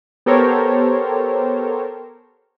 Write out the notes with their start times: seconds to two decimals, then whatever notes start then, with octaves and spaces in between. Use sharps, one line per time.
0.26 B3 G4 A4 A#4 C5 C#5